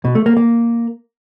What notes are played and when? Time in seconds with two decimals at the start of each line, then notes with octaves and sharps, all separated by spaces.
0.05 B2
0.15 A3
0.26 A#3
0.37 A#3